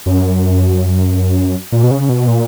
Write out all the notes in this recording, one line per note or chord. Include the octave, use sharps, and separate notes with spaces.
F#2
A#2
B2
C#3
B2
A#2